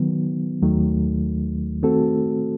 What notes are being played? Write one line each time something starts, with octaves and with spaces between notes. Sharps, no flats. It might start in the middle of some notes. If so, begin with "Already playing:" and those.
Already playing: D#3 F#3 B3
D#2 D#3 F#3 A3
D#3 A3 C4 F#4 A4